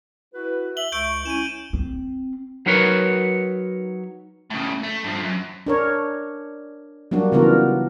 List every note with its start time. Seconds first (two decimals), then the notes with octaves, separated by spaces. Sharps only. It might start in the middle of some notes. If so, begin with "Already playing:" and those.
0.34 E4 F#4 B4
0.77 E5 F#7 G7
0.92 C#2 C#6 G6 D7
1.26 C#4 E4 D#7 E7
1.73 C4
2.66 F#3 D#4 A#4 B4 C#5
4.51 A2 C#3
4.83 A3
5.04 G2 F3
5.23 F#2
5.66 D4 A#4 C#5
7.11 F#3 G3 A#3 D4 F#4
7.32 C#3 E3 B3 F4 F#4 A#4